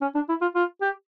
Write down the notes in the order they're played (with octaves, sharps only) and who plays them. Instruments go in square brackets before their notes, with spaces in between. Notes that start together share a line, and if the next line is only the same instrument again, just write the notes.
[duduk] C#4
D4
E4
F4
F4
G4